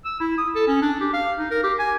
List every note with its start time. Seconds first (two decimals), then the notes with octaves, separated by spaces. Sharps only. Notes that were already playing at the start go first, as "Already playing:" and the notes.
0.05 E6
0.20 E4
0.38 D#6
0.55 A4
0.67 C#4
0.82 D4
1.00 G4
1.13 F5
1.39 D#4
1.51 A#4
1.63 G4
1.79 G#5